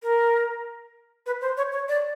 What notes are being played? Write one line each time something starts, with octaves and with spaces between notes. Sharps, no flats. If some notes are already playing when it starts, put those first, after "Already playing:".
A#4
B4
C5
C#5
C#5
D5